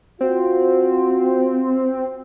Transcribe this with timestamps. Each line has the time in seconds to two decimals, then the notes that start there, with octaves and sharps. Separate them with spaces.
0.21 C4 F4 F#4